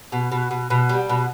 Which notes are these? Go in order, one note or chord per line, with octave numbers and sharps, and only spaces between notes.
B2
B2
B2
B2
G3
B2